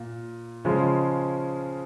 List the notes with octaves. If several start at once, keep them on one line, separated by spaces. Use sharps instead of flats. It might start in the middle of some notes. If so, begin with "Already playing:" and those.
Already playing: A#2
C#3 F3 G#3